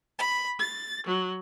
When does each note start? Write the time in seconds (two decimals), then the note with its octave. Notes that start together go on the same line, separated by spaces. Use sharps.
0.18 B5
0.59 A6
1.05 F#3